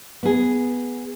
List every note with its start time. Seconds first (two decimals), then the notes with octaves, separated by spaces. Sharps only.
0.23 B3 G#4